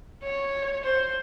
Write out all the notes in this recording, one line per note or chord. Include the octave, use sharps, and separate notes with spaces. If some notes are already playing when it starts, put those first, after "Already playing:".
C#5
C5